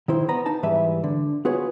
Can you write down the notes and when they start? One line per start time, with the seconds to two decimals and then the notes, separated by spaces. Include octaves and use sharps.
0.08 D#3 E4 C5
0.28 B3 A#5 B5
0.46 D#4 A5
0.63 G#2 E3 G3 B4 E5
1.04 D3
1.45 B3 F4 F#4 G#4 B4 C#5